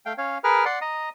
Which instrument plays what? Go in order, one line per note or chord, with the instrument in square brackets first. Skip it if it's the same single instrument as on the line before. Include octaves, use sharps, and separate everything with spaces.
[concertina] A3 F5 G5
C#4 C#5 F5
G#4 A#4 B4 F6
D5 F#5 C6
D#5 A#5 D#6